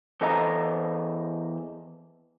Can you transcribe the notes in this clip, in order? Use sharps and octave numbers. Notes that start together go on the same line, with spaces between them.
E2 A4 C5 D#5 A5 A#5